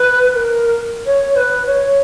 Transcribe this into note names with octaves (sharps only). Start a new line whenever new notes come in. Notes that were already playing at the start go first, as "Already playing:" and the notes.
Already playing: B4
B4
A#4
C#5
B4
C#5